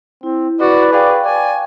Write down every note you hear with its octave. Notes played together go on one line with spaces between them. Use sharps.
C4 E4
F#4 B4 D5
G#4 D5 F5 G5 C#6
D5 G#5